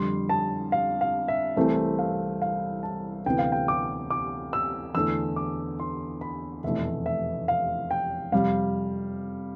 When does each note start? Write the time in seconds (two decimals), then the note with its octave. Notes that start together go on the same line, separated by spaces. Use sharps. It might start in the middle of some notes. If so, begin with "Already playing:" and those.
Already playing: F2 D3 G3 C6
0.29 A5
0.72 F5
1.01 F5
1.28 E5
1.56 C2 C3 E3 A3 C4
1.99 F5
2.42 F5
2.83 A5
3.26 D2 C3 E3 B3 G5
3.39 F5
3.52 G5
3.68 D6
4.10 D6
4.53 E6
4.94 E2 D3 A3 E6
5.36 D6
5.80 C6
6.21 B5
6.64 F1 E2 B2 A3 E5
7.06 E5
7.48 F5
7.91 G5
8.32 F2 C3 G3 F5